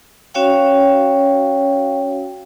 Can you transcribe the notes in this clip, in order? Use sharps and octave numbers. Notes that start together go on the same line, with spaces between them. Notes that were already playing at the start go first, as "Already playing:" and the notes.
C#4 F#4 C#5 F5 G5